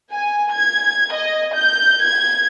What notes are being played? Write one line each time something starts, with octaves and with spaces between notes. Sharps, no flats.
G#5
G#6
D#5
G6
G#6